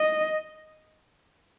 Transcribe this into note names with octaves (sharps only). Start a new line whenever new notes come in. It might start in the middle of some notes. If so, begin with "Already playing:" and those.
Already playing: D#5